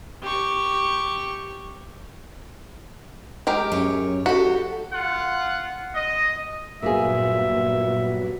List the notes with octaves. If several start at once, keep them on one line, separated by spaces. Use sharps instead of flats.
G4 C#6
G#3 G4 A#4
F#2 C#5
F#4 G4 A4
F4 F#5
D#5
G2 A#2 F#3 A#3 B3 F4 G#4 E5